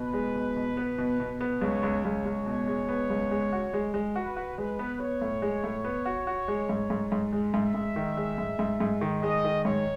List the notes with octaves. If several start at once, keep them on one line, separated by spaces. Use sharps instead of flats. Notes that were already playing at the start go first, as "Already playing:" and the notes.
Already playing: B2 B4
G#3
B2
B2
B3
B2
B2
B3
C#2 C#5
C#2
C#2 C#5
C#2
B2
G#3
B3
C#2
G#3
F#4
G#3
G#3
F#4 B4
F#4
G#3 B4
B3
B3 C#5
A2
G#3
A2
B3
F#4
F#4
G#3
G#2
G#2
G#2
G#3
G#2 E5
G#2
D#3
G#3
G#2
G#2
G#2
D#3
G#3 D#5
D#3
G#2 C#5